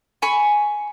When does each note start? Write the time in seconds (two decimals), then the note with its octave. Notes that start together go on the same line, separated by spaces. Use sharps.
0.22 G#5 B5 C#6